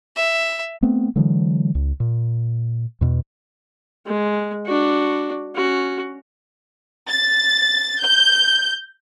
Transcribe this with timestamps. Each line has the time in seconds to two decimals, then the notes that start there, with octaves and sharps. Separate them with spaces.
0.16 E5
0.82 A3 B3 C4
1.16 D3 E3 F#3 G#3
1.75 C#2
2.00 A#2
3.01 E2 B2
4.06 G#3
4.66 D4 F#4
5.55 C#4 F#4
7.09 A6
8.00 G6